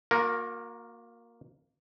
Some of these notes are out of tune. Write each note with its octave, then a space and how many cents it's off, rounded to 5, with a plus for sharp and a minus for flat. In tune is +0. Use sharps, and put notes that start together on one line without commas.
A#3 +0 F#4 -45 A#4 +0